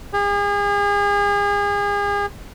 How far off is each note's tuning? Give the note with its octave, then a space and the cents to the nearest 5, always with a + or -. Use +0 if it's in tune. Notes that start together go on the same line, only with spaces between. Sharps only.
G#4 -35